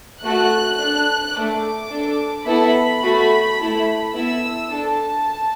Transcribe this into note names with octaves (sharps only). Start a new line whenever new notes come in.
A3 F#4 A4 F#6
D4 A4
A3 D4 A4 D6
D4 A4
B3 E4 A4 B5
A3 F#4 A4
A3 E4 A4
B3 E4 A4 E6
D4 A4 A5